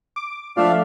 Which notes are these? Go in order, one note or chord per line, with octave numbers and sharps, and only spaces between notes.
D6
F3 A3 D4 D5 E5 F5